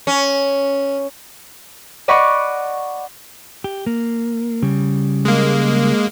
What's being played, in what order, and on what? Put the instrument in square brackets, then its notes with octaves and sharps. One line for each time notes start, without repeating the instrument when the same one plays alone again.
[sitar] C#4
[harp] D5 D#5 F#5 B5 C#6
[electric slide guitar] G4
A#3
C#3 G3
[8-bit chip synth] G#3 A#3